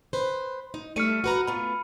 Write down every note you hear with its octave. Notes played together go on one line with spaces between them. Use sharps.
B4 C5
D#4
G3 A3 E5 F6 C#7 D#7
F#4 B4 A#5
A3 B3 F4 B5